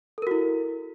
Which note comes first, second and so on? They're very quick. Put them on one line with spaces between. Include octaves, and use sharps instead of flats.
A4 A#4 F#4 E4